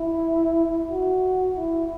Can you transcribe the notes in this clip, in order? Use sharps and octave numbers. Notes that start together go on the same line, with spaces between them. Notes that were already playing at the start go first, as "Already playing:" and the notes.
Already playing: E4
F#4
E4